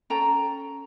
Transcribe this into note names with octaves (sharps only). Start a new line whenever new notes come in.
C#4 A4 G5 A#5